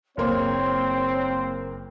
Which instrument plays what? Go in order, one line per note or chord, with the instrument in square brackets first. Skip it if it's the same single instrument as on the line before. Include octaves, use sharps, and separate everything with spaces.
[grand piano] F#1 A#3 C5 [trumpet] C4 [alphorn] C#5 [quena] C6